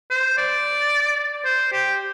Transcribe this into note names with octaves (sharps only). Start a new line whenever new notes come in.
C5
D5
C5
G4